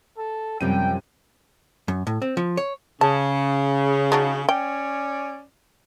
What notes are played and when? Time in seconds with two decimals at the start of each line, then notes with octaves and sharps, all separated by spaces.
0.18 A4
0.61 F#2 C3 F3 G3 G5 D#7
1.88 F#2
2.07 A2
2.22 C4
2.37 F3
2.57 C#5
3.01 C#3 A5
4.12 F#3 D4 D#4
4.49 C#4 C#5 D5 G5